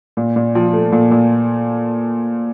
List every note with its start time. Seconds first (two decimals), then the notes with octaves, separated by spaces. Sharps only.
0.17 A#2
0.36 A#2
0.55 F3
0.73 A3
0.92 A#2
1.11 A#2